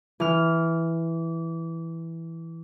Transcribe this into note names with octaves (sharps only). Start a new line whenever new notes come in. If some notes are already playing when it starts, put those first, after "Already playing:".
E3 F6